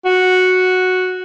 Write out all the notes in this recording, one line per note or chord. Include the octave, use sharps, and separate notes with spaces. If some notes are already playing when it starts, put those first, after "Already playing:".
F#4